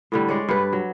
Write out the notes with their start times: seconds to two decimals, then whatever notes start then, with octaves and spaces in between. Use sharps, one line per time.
0.12 A2 D3 G3
0.28 G#3 C#5 D5
0.49 G2 B4
0.73 F#3